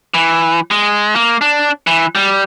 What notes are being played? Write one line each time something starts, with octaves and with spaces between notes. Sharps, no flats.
E3
G#3
A#3
D4
E3
G3